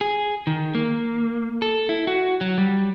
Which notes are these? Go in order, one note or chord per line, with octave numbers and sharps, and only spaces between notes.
G#4
D#3
A#3
A4
E4
F#4
F#3
G3